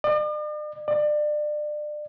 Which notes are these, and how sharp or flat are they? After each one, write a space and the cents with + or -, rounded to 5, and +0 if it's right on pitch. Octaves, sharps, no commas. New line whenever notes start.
D5 +45
D5 +30